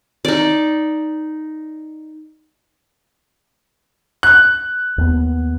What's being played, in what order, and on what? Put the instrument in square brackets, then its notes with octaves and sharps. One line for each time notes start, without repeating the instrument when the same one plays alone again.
[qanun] D#4 D5
[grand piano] F#6
[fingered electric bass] D#2 B3